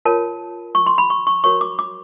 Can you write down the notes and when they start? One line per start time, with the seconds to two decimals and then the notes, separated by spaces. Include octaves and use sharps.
0.05 F4 A#4 C#5 A5
0.75 C#6
0.86 C6
0.98 B5
1.10 C#6
1.27 C#6
1.44 F#4 A#4 C#5 C#6
1.61 D6
1.79 D6